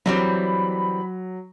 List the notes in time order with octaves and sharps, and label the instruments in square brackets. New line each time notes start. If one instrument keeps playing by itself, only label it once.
[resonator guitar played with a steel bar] E3 G3 C4 [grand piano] F#3 [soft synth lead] B5